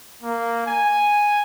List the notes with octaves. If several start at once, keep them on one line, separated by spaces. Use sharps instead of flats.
A#3
G#5